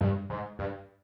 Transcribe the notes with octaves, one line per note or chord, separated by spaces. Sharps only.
G2
G#2
G2